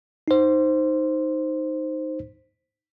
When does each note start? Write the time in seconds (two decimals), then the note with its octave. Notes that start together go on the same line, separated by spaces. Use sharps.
0.28 D#4 C5